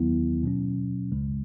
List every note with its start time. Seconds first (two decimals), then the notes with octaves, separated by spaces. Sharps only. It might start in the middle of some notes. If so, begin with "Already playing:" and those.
Already playing: D#2 D#3 F#3 B3 E4
0.43 B2 F#3 C#4
1.12 C#2 C#3 G#3